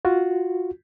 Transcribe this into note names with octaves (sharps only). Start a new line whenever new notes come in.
F4 F#4